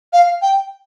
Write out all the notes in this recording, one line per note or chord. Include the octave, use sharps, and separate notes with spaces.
F5
G5